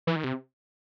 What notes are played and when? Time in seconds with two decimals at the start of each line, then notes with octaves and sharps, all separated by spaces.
0.07 E3
0.16 D#3
0.24 C3